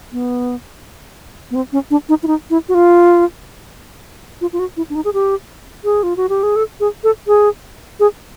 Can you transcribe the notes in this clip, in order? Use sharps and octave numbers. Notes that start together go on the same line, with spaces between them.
B3
B3
C4
C#4
D4
D#4
E4
D#4
E4
F#4
F4
F4
F4
F#4
E4
D4
D#4
G#4
G4
G#4
F4
F#4
G4
G#4
A4
G#4
A4
G#4
G#4